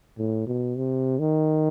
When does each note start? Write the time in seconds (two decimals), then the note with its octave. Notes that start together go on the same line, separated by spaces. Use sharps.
0.18 A2
0.47 B2
0.76 C3
1.19 D#3